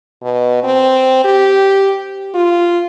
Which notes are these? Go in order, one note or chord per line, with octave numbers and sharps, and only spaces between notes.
B2
C4
G4
F4